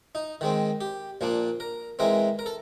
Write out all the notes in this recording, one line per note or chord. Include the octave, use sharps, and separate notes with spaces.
D#4
D#3 G#3 C4
G4
A#2 F3 A#3 D4
A#4
E3 G#3 C4 A#4
A#4
A4